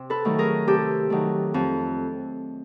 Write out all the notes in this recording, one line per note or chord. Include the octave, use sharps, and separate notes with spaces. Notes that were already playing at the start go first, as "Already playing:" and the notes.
Already playing: C3
A4 B4
D#3 F#3 A3
G#4 A#4
C3 G4 A4
D#3 F#3 A3
F2